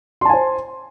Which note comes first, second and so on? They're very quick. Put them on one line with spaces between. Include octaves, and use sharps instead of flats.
C6 A5 G#5 C5